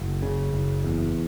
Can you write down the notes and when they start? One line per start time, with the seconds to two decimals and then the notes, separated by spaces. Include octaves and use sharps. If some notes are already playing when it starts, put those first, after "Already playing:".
Already playing: F#1
0.22 C#3
0.53 F#1
0.84 E2